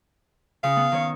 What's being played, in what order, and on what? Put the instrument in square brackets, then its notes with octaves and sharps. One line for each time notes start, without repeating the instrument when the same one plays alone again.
[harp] C#3 [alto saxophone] F5
[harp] B3
D#3 C#5